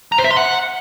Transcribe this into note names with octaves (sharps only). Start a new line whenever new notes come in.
A#5
C5
E5
C6
F#5